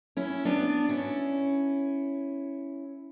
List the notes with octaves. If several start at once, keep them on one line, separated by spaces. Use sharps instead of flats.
C#4 E4
B3 D4
C#4 E4